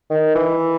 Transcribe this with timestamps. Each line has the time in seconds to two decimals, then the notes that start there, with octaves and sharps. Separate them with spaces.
0.10 D#3
0.35 E3